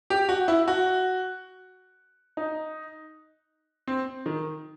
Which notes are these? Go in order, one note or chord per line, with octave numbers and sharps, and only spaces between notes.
G4
F#4
E4
F#4
D#4
C4
D#3